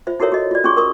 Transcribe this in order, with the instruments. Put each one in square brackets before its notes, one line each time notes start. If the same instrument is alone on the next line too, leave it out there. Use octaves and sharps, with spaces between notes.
[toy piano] F4 C5 E5
E4 F#4 A4 A#4 C#5 E5
F#4 D#5
F4 D5
C#4 F4 G#4 C6 C#6
A#4 C#6 D#6